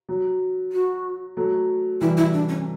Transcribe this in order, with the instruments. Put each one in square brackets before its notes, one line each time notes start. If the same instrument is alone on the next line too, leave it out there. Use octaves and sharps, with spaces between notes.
[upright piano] F#3
[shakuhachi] F#4
[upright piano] F#3 A3
[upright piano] E3 G3 [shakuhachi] E4
[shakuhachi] E4
D4
C#4